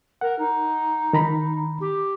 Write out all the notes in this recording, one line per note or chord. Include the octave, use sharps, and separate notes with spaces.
A#4 F#5
D#4
D#3 A#5 B5
G4